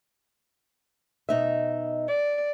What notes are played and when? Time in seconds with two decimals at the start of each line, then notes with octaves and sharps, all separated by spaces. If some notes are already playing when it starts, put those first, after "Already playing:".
1.29 B2 D#4 E5
2.08 D5